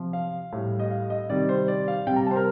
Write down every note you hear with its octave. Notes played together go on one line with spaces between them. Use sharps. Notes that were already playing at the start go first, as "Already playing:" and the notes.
Already playing: C3 F3
F5
A2 G3
D#5
F5
D#5
C3 D#3 G3 D5
C5
D5
F5
C3 G3 G5
A#5
A5
C5
A#4